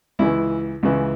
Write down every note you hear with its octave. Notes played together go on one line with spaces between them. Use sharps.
C#2 C#3 E3 E4
C#2 C#3 E3